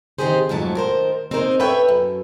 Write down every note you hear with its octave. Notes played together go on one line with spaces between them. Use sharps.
D#3 C4 G4 G#4 C5
F2 G#2 F#3 A3 A5
D#3 A#4 C5
C4 D#4 G#4 A#4 C5
A4 B4 C#5 E5 G5
F#2